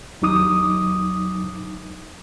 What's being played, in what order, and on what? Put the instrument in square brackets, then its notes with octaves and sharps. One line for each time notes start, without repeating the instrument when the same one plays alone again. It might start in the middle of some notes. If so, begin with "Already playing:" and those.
[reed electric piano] D#2 F#3 D#4 D6 D#6